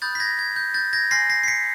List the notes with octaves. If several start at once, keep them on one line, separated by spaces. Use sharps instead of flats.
B5 D#6 F#6 G6 A6
B6
G#6 A#6
G#6
G6
G6 A6
G#6 A#6
G#5 C6 F6 A#6 C7
A#6 C7
C7
B6 C#7